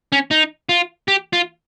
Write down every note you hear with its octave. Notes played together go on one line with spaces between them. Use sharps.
C#4
D#4
F4
G4
F4